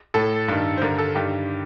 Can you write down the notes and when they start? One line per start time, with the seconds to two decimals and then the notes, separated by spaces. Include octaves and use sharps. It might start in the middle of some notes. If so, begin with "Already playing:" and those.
0.14 A2 A4
0.48 G2 D#3
0.77 C5
0.81 G2 D3 A#4
0.98 A4
1.15 G2 D#3 G4